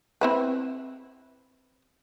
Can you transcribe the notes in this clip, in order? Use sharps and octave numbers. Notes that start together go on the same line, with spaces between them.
C4 E4 B4